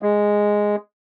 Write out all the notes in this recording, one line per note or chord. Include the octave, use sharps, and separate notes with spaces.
G#3